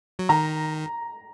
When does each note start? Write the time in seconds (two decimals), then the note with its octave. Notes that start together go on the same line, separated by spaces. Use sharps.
0.19 F#3
0.29 D#3 A#5